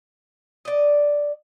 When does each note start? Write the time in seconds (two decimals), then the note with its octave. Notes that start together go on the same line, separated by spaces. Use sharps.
0.65 D5 D#5